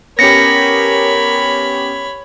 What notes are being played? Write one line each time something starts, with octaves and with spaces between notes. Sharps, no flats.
B3 C#4 G4 A#4 C#5 B5 A#6 C#7